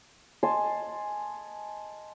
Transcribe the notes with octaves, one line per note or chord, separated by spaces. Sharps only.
D#5 G#5 A5 C6